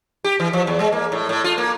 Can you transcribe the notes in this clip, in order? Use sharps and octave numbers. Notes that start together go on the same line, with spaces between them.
G4
E3
F3
E2
G#3
A#3
A2
A2
F4
A#3